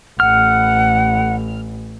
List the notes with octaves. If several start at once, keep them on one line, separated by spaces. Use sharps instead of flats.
A1 F#5 F6